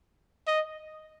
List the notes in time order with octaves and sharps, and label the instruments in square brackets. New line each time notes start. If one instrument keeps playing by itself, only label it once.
[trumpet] D#5